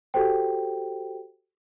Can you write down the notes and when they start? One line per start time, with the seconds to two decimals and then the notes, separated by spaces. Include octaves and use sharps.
0.14 F#4 G4 A4 C5 G5